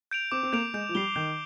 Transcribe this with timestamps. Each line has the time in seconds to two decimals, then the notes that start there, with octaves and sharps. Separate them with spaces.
0.11 G6 D7 F7
0.32 C4 D6
0.43 C4
0.53 A#3 G6 D7 F7
0.74 G#3 G6
0.89 F3
0.95 G3 C7 G7
1.15 D#3 G6